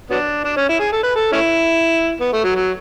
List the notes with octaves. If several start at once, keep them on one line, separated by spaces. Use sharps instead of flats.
F#3 B3 D4
D4
C#4
E4
G#4
A4
B4
A4
A3 C#4 E4
B3
A3
F#3
F#3